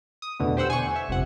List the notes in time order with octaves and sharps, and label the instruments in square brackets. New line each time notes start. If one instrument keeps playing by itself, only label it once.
[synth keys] D#6
E2 B2 D3 A3 B3
G4 C5 F#5 E6
G#5 C#6
E5
G1 F2 C3 F#5